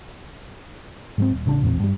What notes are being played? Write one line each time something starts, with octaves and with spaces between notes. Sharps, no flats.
G#2 F#3 C4
D#1
A1 C#3 A3 D4
A1 E2 A#2 C4
G2 G3